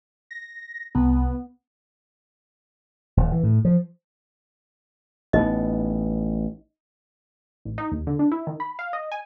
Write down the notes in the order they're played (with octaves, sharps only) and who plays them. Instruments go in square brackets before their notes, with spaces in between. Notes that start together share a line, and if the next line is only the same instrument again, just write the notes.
[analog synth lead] A#6
[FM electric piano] C2 [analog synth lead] B3
[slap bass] D#1
E3
A2
F3
[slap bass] A1 B3 [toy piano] D#4 D#5
[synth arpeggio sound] A1
D#4
D#2
D3
D4
E4
D#3
B5
F5
D#5
G#5